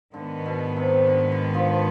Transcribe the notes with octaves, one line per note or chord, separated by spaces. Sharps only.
G#2 D3 D#3 B3
B2
C3
D3
D3
F3